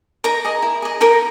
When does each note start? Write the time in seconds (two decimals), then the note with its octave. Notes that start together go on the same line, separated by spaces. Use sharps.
0.24 D#4 A#4 A#5
0.45 G#4 D#5
0.62 E4
0.82 G#4 D#5
1.00 D#4 A#4 A#5